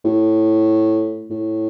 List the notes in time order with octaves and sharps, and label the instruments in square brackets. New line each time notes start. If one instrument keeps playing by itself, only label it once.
[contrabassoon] A2
A2